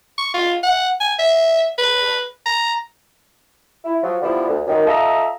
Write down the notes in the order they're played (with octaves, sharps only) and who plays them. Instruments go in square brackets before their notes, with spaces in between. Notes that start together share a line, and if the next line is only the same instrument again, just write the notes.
[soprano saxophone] C#6
F4
F#5
G#5
E5
B4
A#5
[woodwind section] E4
F3 F#3
D3 F3 G3 B3 E4
D2
F#2 D#3
F4 A4 D#5 E5 A#5